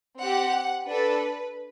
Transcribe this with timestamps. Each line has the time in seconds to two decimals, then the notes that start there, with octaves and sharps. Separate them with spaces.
0.19 C4 G4 F#5
0.87 D4 A4 B4